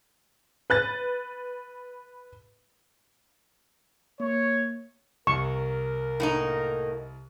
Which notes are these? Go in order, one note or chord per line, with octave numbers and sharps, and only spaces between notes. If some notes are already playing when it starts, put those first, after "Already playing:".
B4 F#6 A6
A#3 C#5
C2 A#4 C#6 E7
A2 A#3 D#4